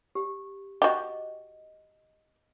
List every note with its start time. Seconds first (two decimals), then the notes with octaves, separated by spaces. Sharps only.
0.15 G4
0.82 F#4 G4 D#5